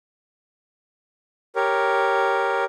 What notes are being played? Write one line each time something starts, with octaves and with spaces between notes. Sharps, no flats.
G4 A#4 C#5